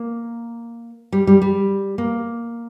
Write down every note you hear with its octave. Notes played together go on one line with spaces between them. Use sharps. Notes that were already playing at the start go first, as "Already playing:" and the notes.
Already playing: A#3
G3
G3
G3
A#3